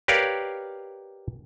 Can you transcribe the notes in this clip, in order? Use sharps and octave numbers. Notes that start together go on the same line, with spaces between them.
G4 A#4 B4 C#5 D5 F5